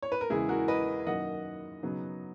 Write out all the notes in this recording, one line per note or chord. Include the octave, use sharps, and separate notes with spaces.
C#5
B4
A#4
E2 C#3 E3 G#3 E4 G#4
F#4 A#4
B4 D#5
F#2 D#3 F#3 A#3 D#5 F#5
C#3 F#3 B3 D#4